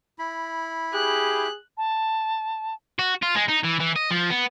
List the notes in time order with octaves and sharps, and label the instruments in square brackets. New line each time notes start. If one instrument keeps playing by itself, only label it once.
[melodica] E4 B5
[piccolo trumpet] G4 [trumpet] G#4 [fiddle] F#6
[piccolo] A5
[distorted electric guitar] F#4
F4
G#3
D#4
E3
E3
D#5
F3
B3